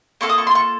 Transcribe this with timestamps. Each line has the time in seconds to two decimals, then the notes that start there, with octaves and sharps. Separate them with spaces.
0.21 A#3 F4 A4 C#6
0.29 D#6
0.38 C#6
0.47 C6
0.55 C#6